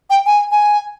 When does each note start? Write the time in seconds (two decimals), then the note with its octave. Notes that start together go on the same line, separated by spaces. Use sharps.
0.10 G5
0.27 G#5
0.52 G#5